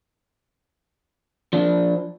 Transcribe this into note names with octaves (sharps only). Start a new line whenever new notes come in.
F3 D4